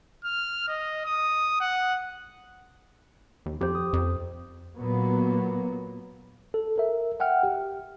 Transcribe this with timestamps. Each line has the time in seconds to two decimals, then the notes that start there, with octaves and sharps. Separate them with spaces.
0.24 F6
0.68 D#5
1.06 D#6
1.61 F#5
3.46 D#2
3.61 F2 G4 C5
3.75 D#6
3.93 F2
4.77 A#2 F#3 A#3 B3
6.54 A4
6.78 A#4 E5
7.20 E5 F#5 G5 F6
7.43 G4